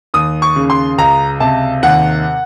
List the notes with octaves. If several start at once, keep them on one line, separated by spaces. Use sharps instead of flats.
D#2 D#6
C#6
C#3
C6
C#2 A#5
C3 A5
D#2 F#5